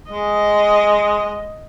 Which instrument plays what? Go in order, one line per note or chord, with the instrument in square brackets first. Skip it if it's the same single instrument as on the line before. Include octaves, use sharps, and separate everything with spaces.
[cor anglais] G#3 [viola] D#5